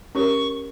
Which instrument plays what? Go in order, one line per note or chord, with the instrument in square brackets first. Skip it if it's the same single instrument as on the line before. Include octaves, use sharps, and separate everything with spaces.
[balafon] C#4 G4 A#4 C#5 [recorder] C#6